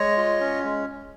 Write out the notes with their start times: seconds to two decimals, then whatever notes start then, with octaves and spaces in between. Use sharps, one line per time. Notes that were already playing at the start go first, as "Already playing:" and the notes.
Already playing: G#3 C#5 D#5
0.17 F4
0.40 C#4
0.64 G#3